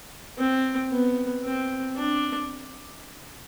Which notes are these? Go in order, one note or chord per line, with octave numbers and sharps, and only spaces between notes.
C4
B3
C4
D4